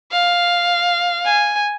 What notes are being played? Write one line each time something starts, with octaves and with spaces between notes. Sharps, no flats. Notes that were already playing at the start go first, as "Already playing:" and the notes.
F5
G#5